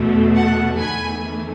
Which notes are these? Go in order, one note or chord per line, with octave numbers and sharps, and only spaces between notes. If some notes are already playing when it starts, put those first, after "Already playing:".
Already playing: E2 B2 A3
F#5 A5
E2 D#3 A3 G#5 B5